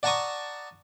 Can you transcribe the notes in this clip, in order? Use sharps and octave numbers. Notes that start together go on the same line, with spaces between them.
D5 F#5 A5 A#5 C#6 D#6